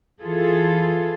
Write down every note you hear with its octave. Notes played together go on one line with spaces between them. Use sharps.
E3 F4 G#4 A4